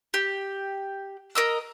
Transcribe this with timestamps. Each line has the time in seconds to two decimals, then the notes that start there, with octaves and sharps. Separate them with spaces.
0.14 G4
1.35 A#4 D#5 E6